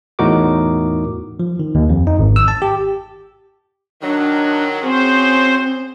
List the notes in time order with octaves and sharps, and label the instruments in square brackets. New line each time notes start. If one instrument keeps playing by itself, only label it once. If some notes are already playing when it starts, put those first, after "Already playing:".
[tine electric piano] E2 A2 D#4 F#4 A#4 D6
F3
D#3
D#2
F2
D#4
G#1
E6
A5
G4
[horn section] D#3 F#3 [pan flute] D4
[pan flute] C4 [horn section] C#4 F#4 G#4 [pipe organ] C5